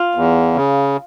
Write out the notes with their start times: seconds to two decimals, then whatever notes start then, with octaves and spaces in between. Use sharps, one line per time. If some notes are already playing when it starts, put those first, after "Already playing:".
Already playing: F4
0.15 E2
0.54 C#3